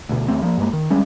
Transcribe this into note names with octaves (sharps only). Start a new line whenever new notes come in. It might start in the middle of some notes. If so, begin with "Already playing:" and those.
D2 B2
D#2 A2 A3 C4
F3 G#3 A#3
G2 G#3 A#3
D#3
D2 G3 G#3 C#4